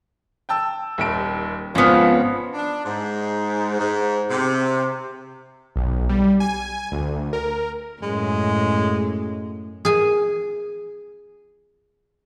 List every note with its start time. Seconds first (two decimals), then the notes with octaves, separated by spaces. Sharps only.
0.49 G5 A5 E6
0.98 D#1 D#2 D7
1.75 G#1 F3 B3 C#4 F6
2.54 D4
2.84 G#2
3.79 G#2
4.30 C3
5.76 B1
6.09 G3
6.40 G#5
6.92 D2
7.33 A#4
8.02 F#2 A2 G#3
9.85 G#4 G#5